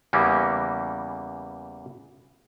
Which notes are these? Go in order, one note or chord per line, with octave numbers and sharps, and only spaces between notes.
E2 C#3 E3 G3 A#3 C#4